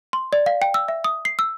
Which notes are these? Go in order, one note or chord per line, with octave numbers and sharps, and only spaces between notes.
C6
D5
F5
G5
E6
E5
D#6
C7
E6